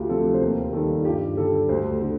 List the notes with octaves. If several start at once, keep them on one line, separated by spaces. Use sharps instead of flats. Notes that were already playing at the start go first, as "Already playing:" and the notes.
Already playing: D2 F4 G4
C3 F3 A4
C5
D#2 A#4
D#3 G3 A4
F4
G2 G4
D3 G3 A4
D2 C5
D3